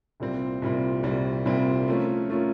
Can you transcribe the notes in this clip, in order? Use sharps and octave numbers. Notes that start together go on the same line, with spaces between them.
C2 A#2 G3 C4
C2 A#2 G3 C4
C2 A#2 G3 C4
C2 A#2 G3 C4
F3 A3 C#4 F4 A#4
F3 A3 C#4 F4 A#4